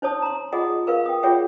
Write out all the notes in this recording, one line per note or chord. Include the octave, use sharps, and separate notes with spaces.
D#4 C5 C#5 A5 D#6
A#5 C6
F4 G#4 D#5 F#5 D#6
A#4 B4 F5 C#6
G5 D#6
F4 G#4 C#5 E5 F#5 G5